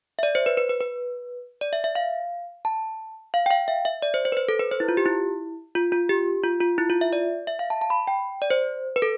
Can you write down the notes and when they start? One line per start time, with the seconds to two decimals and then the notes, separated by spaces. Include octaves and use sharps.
0.19 E5
0.23 D5
0.35 C5
0.46 B4
0.57 B4
0.69 B4
0.81 B4
1.61 D5
1.73 E5
1.84 E5
1.95 F5
2.65 A5
3.34 F5
3.46 G5
3.51 F5
3.68 E5
3.85 E5
4.02 D5
4.14 C5
4.25 C5
4.32 B4
4.37 C5
4.48 A4
4.59 B4
4.71 C5
4.80 E4
4.88 F4
4.97 G4
5.06 E4
5.75 F4
5.92 F4
6.09 G4
6.44 F4
6.61 F4
6.78 E4
6.90 F4
7.01 E5
7.13 D5
7.47 E5
7.59 F5
7.70 A5
7.82 A5
7.90 B5
8.07 G5
8.42 D5
8.50 C5
8.96 B4
9.02 A4